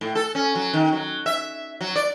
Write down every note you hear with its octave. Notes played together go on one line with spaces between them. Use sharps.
A2
A4
C#4
F#3
D#3
F#3
E5
F#3
D5